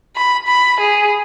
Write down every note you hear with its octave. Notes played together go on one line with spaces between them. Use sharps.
B5
B5
G#4